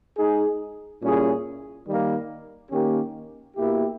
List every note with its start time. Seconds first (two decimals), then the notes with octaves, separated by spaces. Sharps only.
0.17 G#3 D#4 G#4
1.02 A#2 G3 C#4 E4 G#4
1.86 D#3 G3 A#3
2.71 D#3 A#3 C#4 G4
3.56 B2 A#3 E4 G4